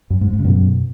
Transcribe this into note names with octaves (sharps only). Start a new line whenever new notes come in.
F#2
G#2
G#2
C#3
F#2 B2